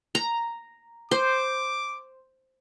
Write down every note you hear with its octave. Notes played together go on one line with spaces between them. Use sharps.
A#5
C5 D6